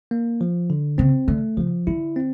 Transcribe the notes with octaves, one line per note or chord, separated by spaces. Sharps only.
A#3
F3
D3
C#3 C4
D3 A3
C#3 F3
D3 E4
C4